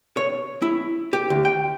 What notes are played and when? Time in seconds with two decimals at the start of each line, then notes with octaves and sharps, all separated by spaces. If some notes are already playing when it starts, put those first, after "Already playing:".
0.17 C#5
0.62 E4
1.13 G4
1.30 D2
1.45 G5